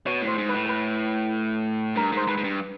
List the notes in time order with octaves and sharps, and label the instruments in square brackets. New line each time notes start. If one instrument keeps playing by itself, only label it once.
[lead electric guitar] B2 [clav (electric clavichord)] C#5
[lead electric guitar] A2
[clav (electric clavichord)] C5
[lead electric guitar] G#2
[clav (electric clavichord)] B4
[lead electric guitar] A2
[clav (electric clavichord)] B4
[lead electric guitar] G2 [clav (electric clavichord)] A#4
[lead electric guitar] G#2 [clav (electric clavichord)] C5
[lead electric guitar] G#2 [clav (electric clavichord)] B4
[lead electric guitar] G#2
G2